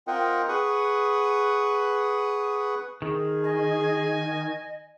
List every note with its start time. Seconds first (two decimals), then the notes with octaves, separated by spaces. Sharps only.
0.07 C4 F4 A#4 D#5 F#5 G5
0.48 G#4 B4 F#5 C#6 D#6
3.02 D#3 G#4
3.44 D#5 G#5